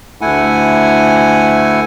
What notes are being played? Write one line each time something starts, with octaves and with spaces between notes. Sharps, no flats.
D2 A3 E4 F#5 G#5